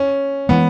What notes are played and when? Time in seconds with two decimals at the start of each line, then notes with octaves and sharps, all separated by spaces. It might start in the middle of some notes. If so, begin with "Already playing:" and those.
Already playing: C#4
0.49 E3 G#3 B3